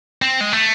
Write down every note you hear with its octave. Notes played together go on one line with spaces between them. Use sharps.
C4
G#3
A3